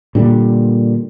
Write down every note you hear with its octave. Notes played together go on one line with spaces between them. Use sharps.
A#2 D3 G3